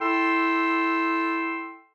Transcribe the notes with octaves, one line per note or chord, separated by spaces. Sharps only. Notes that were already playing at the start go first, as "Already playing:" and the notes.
E4 A4 G5 C6 E6